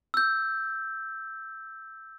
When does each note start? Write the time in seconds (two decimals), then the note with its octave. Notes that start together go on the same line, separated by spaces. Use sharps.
0.14 E6 G6